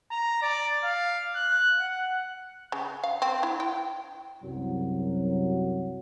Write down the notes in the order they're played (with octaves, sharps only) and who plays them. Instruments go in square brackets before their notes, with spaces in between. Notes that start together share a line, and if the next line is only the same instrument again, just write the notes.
[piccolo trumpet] A#5
D5
F5
F#6
F#5
[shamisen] C#3
F5
C4
E4
G5
[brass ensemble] C2 F#2 F#3